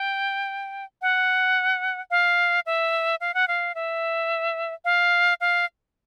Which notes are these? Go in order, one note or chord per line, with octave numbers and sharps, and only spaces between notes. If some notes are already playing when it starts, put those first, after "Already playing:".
Already playing: G5
F#5
F5
E5
F5
F#5
F5
E5
F5
F5